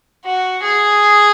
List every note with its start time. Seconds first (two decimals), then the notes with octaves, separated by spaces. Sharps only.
0.25 F#4
0.63 G#4